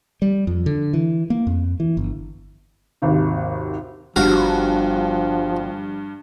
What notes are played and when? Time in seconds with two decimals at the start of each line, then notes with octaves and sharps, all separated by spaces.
0.22 G3
0.47 F2
0.66 D3
0.93 E3
1.30 A#3
1.47 F2
1.80 E3
1.97 G1
3.02 G#1 D#2 C3
4.16 G1 G2 F3 F#4 F5